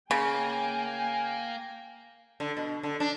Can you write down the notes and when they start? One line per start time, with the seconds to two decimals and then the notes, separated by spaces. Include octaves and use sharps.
0.11 C#3 A#3 G5 G#5
2.40 D3
2.57 B2
2.83 D3
3.00 D4